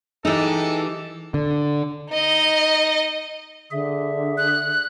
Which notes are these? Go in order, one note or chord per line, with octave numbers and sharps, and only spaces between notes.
E3 G#3 D#4 G4 A4
D3
D#4 D#5
D3 G#4 E5
F#6